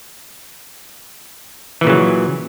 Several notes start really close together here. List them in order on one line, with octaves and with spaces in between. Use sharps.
E3 A#2 C#3 F#3